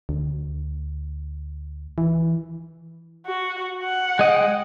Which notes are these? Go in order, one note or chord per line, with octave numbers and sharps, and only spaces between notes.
D2
E3
F#4
F#5
G#3 D#5 G5